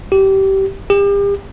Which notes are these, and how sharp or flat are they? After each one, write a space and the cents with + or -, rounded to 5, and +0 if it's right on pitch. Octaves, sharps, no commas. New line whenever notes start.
G4 -20
G4 +40